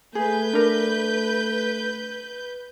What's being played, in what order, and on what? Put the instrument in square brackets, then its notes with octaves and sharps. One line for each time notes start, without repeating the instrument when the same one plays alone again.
[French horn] A3 [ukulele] G#4 [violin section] B4 G6
[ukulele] D4 A#4